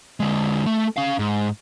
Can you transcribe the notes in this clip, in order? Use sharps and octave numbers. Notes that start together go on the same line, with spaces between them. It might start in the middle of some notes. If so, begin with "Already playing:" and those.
D3 G#3
A3
C#4 F5
G#2